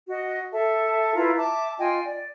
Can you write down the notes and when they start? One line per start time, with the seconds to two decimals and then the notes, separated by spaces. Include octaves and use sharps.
0.08 F#4 D#5
0.52 A4 E5 A5
1.15 E4 F4 B4 A#5
1.37 E5 A5 D6
1.79 F4 D#5 G5 G#5
2.05 D5